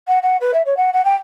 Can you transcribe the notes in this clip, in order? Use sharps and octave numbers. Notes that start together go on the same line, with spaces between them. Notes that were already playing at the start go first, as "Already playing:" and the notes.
F#5
F#5
B4
E5
C#5
F#5
F#5
G5